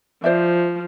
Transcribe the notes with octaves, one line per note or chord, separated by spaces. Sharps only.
F3 C5 D5 E5